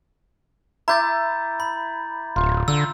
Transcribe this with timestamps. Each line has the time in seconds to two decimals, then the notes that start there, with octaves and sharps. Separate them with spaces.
0.88 E4 A#5 D6 G6 A6
1.60 B5
2.36 D1 F4
2.68 D3 E6